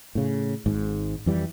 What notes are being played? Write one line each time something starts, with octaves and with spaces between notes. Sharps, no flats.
A2 C#3
G#1 G#2
F2 E3 G3